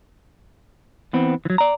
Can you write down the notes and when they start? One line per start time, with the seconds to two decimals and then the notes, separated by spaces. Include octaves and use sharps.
1.13 E3 B3 C4
1.45 E3 F#3
1.58 D5 A#5